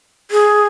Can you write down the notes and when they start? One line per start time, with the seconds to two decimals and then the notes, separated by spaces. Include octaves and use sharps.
0.31 G#4